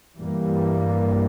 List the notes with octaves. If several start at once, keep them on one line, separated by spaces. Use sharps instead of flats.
G2 E3 G3 A#3